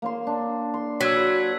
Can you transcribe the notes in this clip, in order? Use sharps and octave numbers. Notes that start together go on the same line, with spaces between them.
A#3 C#5 C6
D4
C6
F#3 E6 G#6 B6
B4